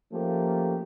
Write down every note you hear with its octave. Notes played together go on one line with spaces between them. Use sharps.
F3 A3 A#3 C#4 G4